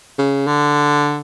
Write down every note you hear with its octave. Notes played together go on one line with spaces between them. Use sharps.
C#3
D3